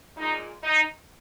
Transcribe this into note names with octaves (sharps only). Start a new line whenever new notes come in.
A#2 G#3 D#4
D#4